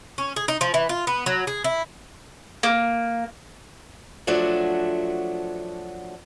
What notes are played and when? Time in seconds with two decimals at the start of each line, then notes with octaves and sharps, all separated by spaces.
0.18 C#4
0.36 G#4
0.48 D#4
0.61 F3
0.74 E3
0.89 F4
1.07 B3
1.26 F#3
1.47 G#4
1.64 E4
2.63 A#3
4.27 F3 F#3 A3 D4 F#4